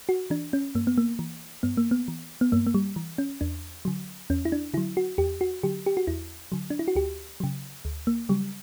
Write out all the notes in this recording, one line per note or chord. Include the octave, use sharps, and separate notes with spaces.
F#4
E3 D4
C#4
G2 A#3
B3
A#3
E3
G2 B3
A#3
B3
E3
B3
G2 A#3
A#3
G3
E3
C#4
E2 D4
D3 F#3
E2 C#4
E4
D4
D3 F#3 E4
F#4
E2 G4
F#4
D3 F#3 G4
G4
F#4
E2 E4
D3 F#3
D4
E4
F#4
D2 G4
C#3 F#3
D2
A#3
C#3 F#3 G3